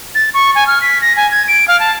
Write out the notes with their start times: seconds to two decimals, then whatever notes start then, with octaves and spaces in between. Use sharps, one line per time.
0.15 A6
0.34 C#6
0.55 G#5
0.67 F6
0.82 B6
1.02 A#6
1.17 G#5
1.31 G#6
1.48 D7
1.68 F5
1.80 A5